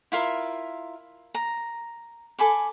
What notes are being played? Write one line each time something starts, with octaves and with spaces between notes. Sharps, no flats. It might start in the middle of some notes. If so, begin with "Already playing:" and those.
E4 F4 A#4 E5
A#5
A4 G#5 B5 D6